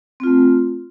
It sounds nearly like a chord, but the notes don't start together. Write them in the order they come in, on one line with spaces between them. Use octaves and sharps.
C4 F4 A3